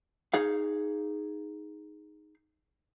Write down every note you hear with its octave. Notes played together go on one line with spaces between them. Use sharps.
D#4 G#4 F5